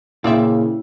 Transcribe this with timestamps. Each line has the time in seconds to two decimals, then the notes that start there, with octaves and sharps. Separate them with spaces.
0.24 A#2 C#3 C4 E4 G4 D5 E5 F5